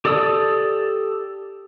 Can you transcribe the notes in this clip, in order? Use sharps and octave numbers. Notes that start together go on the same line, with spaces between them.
G4 A4 D5 D#6 E6